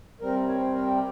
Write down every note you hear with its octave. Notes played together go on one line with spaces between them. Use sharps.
C3 G3 C4 A#4
C#5
C5
A#4
G4